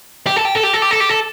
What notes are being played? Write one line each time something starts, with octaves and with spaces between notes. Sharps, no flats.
G4
A4
G4
A4
G4
A4
G4
A4
G4
A4